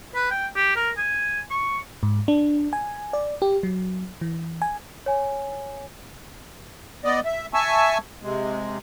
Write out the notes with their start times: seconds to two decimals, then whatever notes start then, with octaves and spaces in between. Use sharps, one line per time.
0.15 B4
0.31 G5
0.56 G4
0.76 A#4
0.98 G#5
1.51 C#6
2.03 G#2
2.28 D4
2.73 G#5
3.13 D5
3.42 G4
3.63 F#3
4.21 E3
4.62 G#5
5.06 C#5 G#5
7.05 B3 D5 D#5
7.25 E5
7.54 E5 G#5 A5 C#6 E6
8.23 C3 G#3